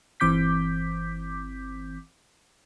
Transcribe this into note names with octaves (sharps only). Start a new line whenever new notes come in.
G1 E3 C4 D6 G6 B6